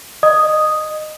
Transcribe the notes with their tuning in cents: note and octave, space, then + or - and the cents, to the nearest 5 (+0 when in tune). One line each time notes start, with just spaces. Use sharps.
D#5 -20 D#6 +0